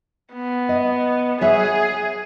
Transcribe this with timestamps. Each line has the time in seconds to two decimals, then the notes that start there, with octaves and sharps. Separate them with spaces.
0.33 B3
0.69 D#5
1.41 G#4 C#5 E5 F#5